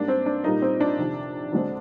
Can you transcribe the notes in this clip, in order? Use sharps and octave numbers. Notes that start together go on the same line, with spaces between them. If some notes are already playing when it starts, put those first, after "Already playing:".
Already playing: G#2 G3 A#3 D4
C4
D4
A#2 G3 A#3 D#4
C4
D4
F2 C3 D#3
D2 D3 G#3 C4